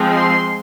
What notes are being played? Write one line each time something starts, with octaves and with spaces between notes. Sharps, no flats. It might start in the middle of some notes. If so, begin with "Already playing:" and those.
Already playing: F3 G#3 C4
C6